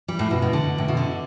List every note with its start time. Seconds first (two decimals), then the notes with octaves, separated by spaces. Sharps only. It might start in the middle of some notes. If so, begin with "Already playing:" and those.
0.08 G3
0.19 A2
0.31 B2
0.42 B2
0.53 D3
0.78 A2
0.88 B2
0.97 D3